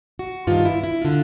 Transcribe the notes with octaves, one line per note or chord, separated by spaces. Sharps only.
F#4
G2 D#3 F4
E4
E4
D3 F4